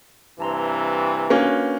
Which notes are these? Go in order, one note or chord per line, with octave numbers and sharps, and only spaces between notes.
G2 C3 E3 A5 A#5 C6
A#3 C#4 D4 F#4 B4